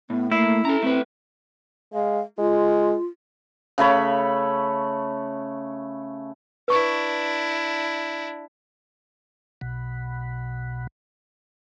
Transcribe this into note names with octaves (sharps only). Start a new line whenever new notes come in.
A2 B3
A3 A#3 E4
C#4 A4 A#5
A3 C4 B4
G#3 F5
G#3 F4
C#3 A3 C#5 B5
D4 E4 B4 C#6
B1 B2